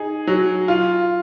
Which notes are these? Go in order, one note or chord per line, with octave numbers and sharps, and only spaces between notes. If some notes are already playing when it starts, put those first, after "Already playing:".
Already playing: D#4 G#4
F#3
F4